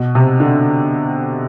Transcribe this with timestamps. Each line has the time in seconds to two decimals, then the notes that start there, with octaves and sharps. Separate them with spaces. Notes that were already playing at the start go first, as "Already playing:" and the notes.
Already playing: B2
0.15 C3
0.40 D3